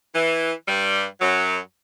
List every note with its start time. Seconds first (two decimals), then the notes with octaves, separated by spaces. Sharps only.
0.14 E3
0.67 G2 G3
1.20 F#2 F#3